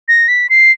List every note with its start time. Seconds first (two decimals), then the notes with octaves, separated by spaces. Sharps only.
0.08 A#6
0.28 B6
0.50 C7